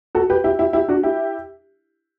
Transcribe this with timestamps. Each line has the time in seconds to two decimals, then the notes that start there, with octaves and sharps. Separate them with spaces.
0.15 F#4 A4
0.30 G4 B4
0.44 E4 G4
0.59 E4 G4
0.73 E4 G4
0.88 D4 F#4
1.03 E4 G4